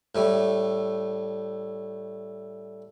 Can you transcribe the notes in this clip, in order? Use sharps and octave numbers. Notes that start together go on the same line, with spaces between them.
A2 G3 A3